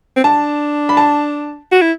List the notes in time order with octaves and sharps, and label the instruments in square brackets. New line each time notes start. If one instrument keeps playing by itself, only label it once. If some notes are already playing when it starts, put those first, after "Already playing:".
[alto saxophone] C4
[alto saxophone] D4 [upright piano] A5
[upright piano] B5
A5
[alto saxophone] F#4
E4